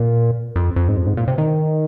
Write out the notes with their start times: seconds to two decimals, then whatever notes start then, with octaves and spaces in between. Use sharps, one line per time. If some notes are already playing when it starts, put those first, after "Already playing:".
Already playing: A#2
0.56 F2
0.76 F2
0.88 G#2
0.97 F2
1.07 G#2
1.17 A#2
1.28 C3
1.38 D#3